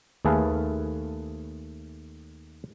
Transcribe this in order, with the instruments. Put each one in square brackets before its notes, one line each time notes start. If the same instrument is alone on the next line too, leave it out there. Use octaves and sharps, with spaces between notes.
[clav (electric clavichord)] D#2 A3 G#4 A4 B4 F5